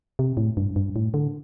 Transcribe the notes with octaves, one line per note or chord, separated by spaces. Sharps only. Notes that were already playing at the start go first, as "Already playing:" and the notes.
C3
A2
G2
G2
A2
D3